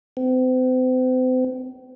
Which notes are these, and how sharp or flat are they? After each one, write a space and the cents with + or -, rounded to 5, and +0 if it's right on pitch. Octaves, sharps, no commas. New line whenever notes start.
C4 -40